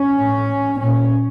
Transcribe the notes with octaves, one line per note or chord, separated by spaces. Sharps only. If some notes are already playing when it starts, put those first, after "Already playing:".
Already playing: C#4
A2
A#2 C#4